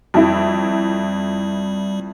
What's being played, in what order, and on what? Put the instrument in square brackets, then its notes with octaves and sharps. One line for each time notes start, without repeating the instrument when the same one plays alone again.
[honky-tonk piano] F2 E4 [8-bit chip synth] G3